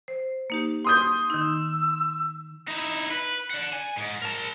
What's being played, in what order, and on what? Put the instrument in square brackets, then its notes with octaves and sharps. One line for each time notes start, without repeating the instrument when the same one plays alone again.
[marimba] C5
A#3 D#4 G4
[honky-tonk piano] C6 D#6 G6
[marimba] D#3 D#4 [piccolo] E6
[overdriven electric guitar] D#4 E4
B4
D5 F#5
G#5
G#2
A#4 A5